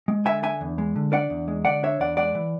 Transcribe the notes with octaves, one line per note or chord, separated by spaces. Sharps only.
G#3
D3 E5 G#5
D4 E5 G#5
E2
G#3
D3
D4 D5 F#5
E2
G#3
D3 D5 F#5
D4 C#5 E5
E2 D5 F#5
G#3 D5 F#5
E3